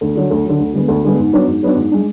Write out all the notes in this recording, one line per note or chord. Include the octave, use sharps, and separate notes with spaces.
D2
D3 F#3
D2
D3 F#3
D2
D3 G#3 B3
D2
D3 G#3 B3
G#2
F#3 B3 D4
G#2
F#3 B3 D4
G#2
G#3 D4